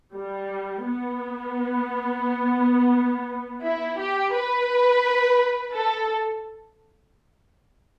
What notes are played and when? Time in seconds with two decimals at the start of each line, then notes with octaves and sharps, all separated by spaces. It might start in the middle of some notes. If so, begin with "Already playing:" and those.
0.14 G3
0.84 B3
3.64 E4
3.99 G4
4.34 B4
5.74 A4